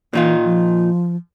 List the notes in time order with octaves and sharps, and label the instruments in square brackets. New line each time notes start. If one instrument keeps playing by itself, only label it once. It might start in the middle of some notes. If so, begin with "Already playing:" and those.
[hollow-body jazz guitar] A#2 D#4 F4 [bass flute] E3
[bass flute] F3